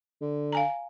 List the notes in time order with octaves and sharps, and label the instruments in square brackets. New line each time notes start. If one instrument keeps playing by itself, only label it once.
[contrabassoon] D3
[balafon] F5 G#5 A#5